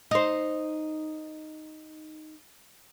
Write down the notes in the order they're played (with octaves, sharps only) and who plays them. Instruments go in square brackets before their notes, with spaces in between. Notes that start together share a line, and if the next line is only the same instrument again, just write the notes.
[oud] D#4 C5